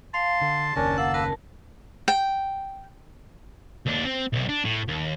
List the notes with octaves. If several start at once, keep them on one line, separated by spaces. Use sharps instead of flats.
F5 A5 C6
D3
F#1 D#2 C#3 C#4 D4 A#4
A#3 F#5 E6
A#4 B4 A5
G5
D#2 D4
C4
B1 C3
D4
A2
D#2